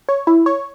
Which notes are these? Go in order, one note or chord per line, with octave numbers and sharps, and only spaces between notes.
C#5
E4
C#5